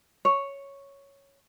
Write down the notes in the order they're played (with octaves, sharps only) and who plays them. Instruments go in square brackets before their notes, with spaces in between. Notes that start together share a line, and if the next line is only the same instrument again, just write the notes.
[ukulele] C#5